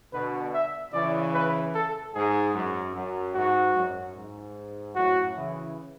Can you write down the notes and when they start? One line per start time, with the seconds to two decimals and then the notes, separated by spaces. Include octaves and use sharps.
0.13 B2 D3 B4
0.54 E5
0.93 C#3 E3 D5
1.34 B4
1.75 A4
2.15 G#2 G#4
2.54 F#2
2.95 F#2
3.35 G#2 F#4
3.75 F#2
4.15 G#2
4.95 F#2 A2 F#4
5.35 C#3 E3